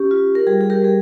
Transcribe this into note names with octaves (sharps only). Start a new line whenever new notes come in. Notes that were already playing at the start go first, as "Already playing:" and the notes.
Already playing: C#4 G4
F4
A#4
G3 G#4
G#4
G4 A#4
G3 G#4